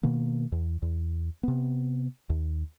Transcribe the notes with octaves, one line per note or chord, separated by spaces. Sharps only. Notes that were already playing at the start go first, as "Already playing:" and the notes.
B2 D#3 A#3
E2
E2
C3 B3
D#2